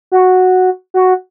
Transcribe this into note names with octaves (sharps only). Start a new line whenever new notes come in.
F#4
F#4